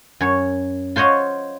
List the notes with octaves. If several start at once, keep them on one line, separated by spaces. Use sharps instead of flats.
F#2 C#5
F4 C5 C#5 D#5 F#5